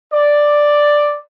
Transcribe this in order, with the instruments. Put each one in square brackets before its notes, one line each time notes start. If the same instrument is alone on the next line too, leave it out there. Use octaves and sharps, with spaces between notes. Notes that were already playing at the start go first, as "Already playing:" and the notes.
[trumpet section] D5